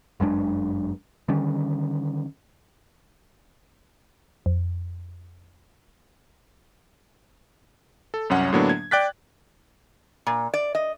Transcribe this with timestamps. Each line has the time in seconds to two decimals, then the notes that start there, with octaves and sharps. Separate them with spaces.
0.20 G1 F#2 G#3 D4
1.28 D3 D#3 G3 C#4
4.46 F2
8.14 A4
8.30 C2 F#2 C#4 F#5
8.53 A2 D3 F#3 A#3 B3 D4
8.69 G#6
8.91 D5 G5 D6 F#6 A6 B6
10.27 A#2
10.54 D5
10.75 D#5